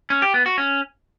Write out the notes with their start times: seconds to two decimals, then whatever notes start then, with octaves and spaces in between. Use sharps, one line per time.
0.10 C#4
0.22 G4
0.34 B3
0.46 F#4
0.58 C#4